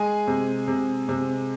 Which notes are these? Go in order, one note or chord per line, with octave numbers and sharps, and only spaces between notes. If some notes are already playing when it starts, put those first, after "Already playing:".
Already playing: G#3 G#4 G#5
C3
C3
C3